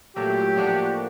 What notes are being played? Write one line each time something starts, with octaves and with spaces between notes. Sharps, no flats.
A#2 F#3 A3 G4
A2 F3 A#3 D4 F#4